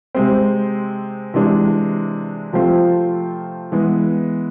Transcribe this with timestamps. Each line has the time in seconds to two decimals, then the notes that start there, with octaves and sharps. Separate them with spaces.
0.15 C3 G#3 C4
1.34 C3 E3 G#3 D4
2.53 C3 F3 A3 C4 F4
3.72 E3 G#3 B3